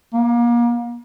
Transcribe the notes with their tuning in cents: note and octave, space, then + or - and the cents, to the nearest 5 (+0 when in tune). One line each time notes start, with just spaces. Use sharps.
A#3 +35